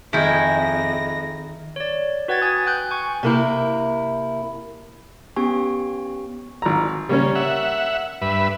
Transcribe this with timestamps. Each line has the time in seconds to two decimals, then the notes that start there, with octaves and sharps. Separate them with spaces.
0.13 F2 D#3 G#3 E4 G#4 G5 A#6
1.76 C#5 D5
2.28 F#4 B4 F#5 G5 G#6 A6
2.42 G#5 D#6
2.66 G5 F#6 G6
2.91 G#5 C#6
3.23 C3 A#3 E4
5.36 B3 C#4 G4 G#5 C#6
6.62 G#1 A#5
7.09 C#3 G3 A#3 C#4
7.35 E5 F#5
8.21 G2 B4 E5